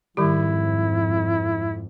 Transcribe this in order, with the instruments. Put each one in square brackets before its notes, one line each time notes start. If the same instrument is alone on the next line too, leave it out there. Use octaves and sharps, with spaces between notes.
[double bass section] F2 G#2 [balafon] D#3 G3 G4 [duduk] E4